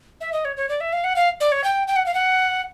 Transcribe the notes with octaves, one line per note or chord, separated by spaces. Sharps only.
E5
D#5
C#5
C#5
D5
E5
F5
F#5
F5
D5
C#5
G5
G5
F#5
F5
F#5